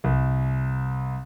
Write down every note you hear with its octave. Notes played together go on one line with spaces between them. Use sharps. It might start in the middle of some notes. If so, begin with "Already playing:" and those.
C2